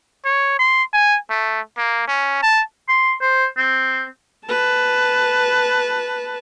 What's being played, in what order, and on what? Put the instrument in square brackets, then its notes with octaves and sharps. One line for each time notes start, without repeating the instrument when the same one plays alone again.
[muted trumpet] C#5
C6
G#5
A3
A#3
C#4
A5
[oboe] C6
C5
C4
[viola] B4 A5